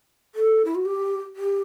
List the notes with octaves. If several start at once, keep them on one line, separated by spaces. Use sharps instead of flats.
A4
E4
F#4
G4
G4